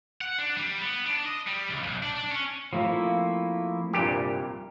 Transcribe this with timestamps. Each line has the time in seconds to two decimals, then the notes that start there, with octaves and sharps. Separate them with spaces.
0.21 F#5
0.38 D4
0.57 G3
0.81 B3
1.05 D4
1.26 D#5
1.47 G3
1.70 C#2
1.83 B1
2.02 D4
2.16 D4
2.32 C#4
2.73 F3 A3 A#3 C4 E4
3.93 C2 G2 A#2 G4